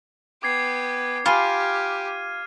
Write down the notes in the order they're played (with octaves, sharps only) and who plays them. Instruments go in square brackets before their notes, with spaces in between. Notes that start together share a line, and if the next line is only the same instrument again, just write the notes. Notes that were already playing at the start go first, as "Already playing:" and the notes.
[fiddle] B3 G5 [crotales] D6 G#6 C7
[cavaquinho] F4 [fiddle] G4 [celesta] G#5 B5 [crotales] F6 D#7